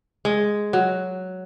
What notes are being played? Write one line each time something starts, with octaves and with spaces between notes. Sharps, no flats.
G#3
F#3